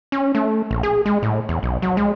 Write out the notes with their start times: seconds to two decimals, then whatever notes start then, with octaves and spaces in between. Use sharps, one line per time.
0.12 C#4
0.35 A3
0.71 A#1
0.83 G#4
1.06 G#3
1.23 A2
1.49 E2
1.63 B1
1.82 F#3
1.97 G#3